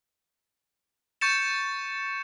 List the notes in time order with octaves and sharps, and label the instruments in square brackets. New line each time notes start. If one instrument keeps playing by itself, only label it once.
[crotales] C#6 G6 A6 C#7 E7